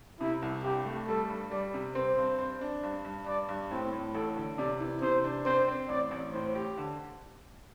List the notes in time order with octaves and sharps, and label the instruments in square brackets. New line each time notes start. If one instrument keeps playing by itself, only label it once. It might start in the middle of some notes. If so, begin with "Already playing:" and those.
[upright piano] C3 [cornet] E4
[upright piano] C2
[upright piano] G2 [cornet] G4
[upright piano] A3
[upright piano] G3 [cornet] A4
[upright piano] G2
[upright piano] G3 [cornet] D5
[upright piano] C3
[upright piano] C4 [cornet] C5
[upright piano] G2
C5
D4
G2
G2
[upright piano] G2 [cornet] D5
[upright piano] G2
[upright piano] A2 [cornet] C4
[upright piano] A2
[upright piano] A1 [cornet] A4
[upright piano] D3
[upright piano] C3 [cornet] D5
[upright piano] E3
[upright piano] C3 [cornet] C5
[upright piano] D4
[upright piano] C4 [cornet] C5
[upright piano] C4
[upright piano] A1 [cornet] D5
[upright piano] A1
[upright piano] A2 [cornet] C5
[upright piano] G4
D3